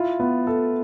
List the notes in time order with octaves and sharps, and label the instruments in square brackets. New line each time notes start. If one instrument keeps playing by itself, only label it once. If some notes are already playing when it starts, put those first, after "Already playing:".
Already playing: [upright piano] E4 F4
B3
A4